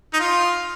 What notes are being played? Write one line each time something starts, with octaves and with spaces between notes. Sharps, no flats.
D#4
F4